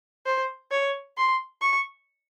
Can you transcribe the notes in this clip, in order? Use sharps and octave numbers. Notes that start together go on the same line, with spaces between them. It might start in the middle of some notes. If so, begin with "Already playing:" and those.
C5
C#5
C6
C#6